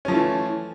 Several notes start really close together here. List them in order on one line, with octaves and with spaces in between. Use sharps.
C#4 F3 A3 E3